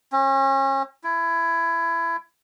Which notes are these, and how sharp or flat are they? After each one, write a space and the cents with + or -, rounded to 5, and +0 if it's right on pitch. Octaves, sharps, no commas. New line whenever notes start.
C#4 -35
E4 +20